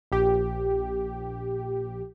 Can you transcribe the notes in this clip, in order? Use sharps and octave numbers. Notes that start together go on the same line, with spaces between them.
A#1 G4